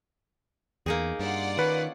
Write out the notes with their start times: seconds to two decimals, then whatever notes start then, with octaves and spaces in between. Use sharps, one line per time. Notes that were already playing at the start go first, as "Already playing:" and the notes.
0.86 E2 A#3 D#4 G#4
1.19 G2 F4 D5 F#5
1.59 D#3 C#4 B4